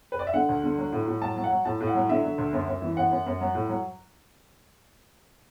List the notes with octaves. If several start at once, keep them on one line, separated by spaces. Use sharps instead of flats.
B4
D5
E5
D3 F#5
D2
D3
F#3
A2
A2
F#3 A5
F#3
F#5
F#3
A2 A5
A2
F#5
F#3
D3 E5
D3
D2
F#2
F#2
E3
F#2 F#5
F#2
F#2
F#3
A2
F#3